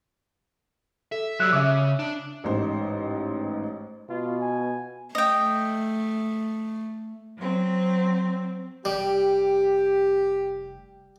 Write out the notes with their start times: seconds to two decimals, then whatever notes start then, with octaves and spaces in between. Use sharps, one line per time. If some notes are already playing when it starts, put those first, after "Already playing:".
1.12 A4 E5
1.40 F#3 G3 E6 F#6
1.52 C#3 E5 D6
1.99 D4
2.44 A1 G#2 C5
4.09 B2 F4
4.41 G#5
5.15 A3 D#5 G5
7.37 F#3 C4
8.85 F1 G3 G4